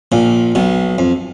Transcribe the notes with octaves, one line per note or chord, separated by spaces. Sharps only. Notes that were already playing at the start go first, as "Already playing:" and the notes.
A#1 A#2
B1 B2
F2